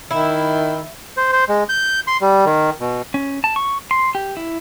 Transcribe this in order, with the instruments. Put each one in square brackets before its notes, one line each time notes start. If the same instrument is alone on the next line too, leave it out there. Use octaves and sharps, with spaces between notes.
[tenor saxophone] D#3 [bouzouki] E4
[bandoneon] C5
C5
G#3
G6
C6
G3
D#3
B2
[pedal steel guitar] C#4
A5
C#6
C6
G4
E4